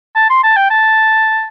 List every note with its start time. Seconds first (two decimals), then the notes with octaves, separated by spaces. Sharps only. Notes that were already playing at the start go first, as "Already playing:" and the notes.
0.15 A5
0.30 C6
0.43 A5
0.56 G5
0.70 A5